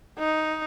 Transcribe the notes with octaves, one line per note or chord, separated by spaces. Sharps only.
D#4